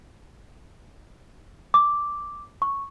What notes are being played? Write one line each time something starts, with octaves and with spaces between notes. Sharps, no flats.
D6
C#6